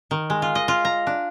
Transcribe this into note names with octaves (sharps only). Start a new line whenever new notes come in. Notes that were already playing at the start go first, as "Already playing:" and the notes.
D#3
G#3
F4
D#5
F4
A#5
D4